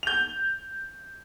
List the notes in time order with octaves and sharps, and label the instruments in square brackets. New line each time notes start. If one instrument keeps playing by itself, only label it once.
[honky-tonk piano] G6 F7